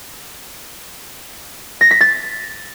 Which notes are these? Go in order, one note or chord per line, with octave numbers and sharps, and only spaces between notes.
A#6
B6
A6